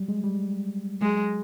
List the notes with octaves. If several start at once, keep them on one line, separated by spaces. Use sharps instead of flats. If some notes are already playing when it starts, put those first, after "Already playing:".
Already playing: F#3 G3
G#3
G3
F#3 G#3